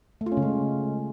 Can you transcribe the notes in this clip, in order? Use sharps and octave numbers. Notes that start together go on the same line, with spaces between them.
A3
F4
C#4
C#3
G#3